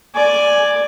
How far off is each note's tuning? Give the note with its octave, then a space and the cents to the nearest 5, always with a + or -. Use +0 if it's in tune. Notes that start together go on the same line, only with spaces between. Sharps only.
D5 +5 G#5 +0